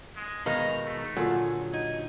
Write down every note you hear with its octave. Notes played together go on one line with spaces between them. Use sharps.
G#3
B2 D#3 G#3 D#4 B4 F5 A#5
A3
A#2 D3 F#3 G#4
D#4 G#5